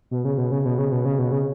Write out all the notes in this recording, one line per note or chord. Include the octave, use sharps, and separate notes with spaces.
B2
C#3
B2
C#3
B2
C#3
B2
C#3
B2
C#3